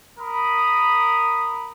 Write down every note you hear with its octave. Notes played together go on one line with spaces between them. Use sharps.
A#4 B5 D#6